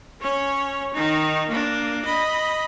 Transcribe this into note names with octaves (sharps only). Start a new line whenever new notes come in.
C#4 C#5
D#3 D#4
A#3 D4
D#5 B5